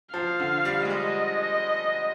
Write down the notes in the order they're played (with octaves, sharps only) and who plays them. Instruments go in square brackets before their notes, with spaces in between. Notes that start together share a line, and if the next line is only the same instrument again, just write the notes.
[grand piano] F3 [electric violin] F5
[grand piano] D3
G3
G#3
[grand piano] G3 [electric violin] D#5